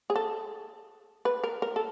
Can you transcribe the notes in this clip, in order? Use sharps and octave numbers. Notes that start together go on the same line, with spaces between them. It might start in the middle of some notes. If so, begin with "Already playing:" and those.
G#4
A4
B4
A#4
A#4
A4